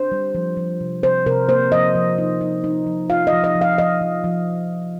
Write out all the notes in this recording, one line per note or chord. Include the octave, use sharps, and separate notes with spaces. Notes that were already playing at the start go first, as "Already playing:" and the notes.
Already playing: D4 C5
G3
F3
F3
C3
C3 C5
C3 A#4
A#3 C5
F3 D#5
F3
D#4
D#4
D#4
F3
F4 F5
D#5
F3
D#5
F3
F5
F3 D#5
F3
F3